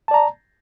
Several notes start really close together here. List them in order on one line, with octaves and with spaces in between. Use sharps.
A5 D5 A#5